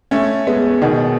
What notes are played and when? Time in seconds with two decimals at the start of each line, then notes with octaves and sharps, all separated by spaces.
0.11 A3 C#4
0.47 G#3 B3
0.82 B2 D#3